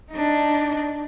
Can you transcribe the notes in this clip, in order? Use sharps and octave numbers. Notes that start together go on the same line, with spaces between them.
D4 D#4